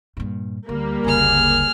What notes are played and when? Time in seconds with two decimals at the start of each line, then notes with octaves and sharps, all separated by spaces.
0.17 G2 A#2
0.69 D2 G3 A#3
1.04 F#1 D2 G#4 F6